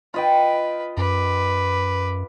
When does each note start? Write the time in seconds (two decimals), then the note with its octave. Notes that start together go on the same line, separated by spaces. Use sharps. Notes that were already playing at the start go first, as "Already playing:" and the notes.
0.14 F4 B4 D#5 G5
0.97 F#2 B4 D6